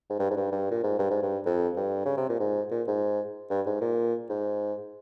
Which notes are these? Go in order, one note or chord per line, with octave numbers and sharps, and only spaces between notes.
G#2
G2
G#2
G2
G2
A#2
G#2
G2
G#2
G2
F2
G2
C#3
C3
A#2
G#2
A#2
G#2
G2
G#2
A#2
G#2